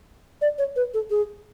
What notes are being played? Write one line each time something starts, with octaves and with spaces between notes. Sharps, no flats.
D5
C#5
B4
A4
G#4